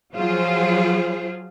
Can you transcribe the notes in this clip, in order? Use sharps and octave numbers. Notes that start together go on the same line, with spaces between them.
F3 F#3 F4 G#4 C5